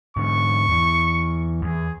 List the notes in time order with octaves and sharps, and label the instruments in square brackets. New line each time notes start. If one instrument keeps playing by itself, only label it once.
[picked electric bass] G#2 D3 [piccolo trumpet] C#6
[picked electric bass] E2 E3
[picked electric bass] E2 [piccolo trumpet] G#4